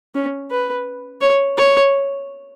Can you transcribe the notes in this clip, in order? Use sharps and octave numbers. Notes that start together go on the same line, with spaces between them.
C#4
B4
C#5
C#5